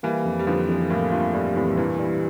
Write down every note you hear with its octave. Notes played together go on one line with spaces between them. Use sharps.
E3 G3 A#3
F2
G3
D3 E3 F3
F2
A2 A#3
G2 F4
A2 G3
A2 C3 E3
A2
G2 A#2 E3
G3